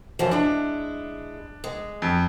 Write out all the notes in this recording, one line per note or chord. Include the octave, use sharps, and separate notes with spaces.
F#2 E3 F3
G#3 D4 E4
G#3
F2